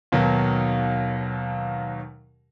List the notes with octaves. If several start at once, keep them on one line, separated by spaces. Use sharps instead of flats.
D#2 B2 D#3 F#3